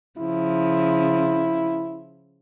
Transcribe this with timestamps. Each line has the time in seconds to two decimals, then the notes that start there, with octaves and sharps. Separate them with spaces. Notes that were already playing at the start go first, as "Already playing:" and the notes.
0.18 C#3 F3 E4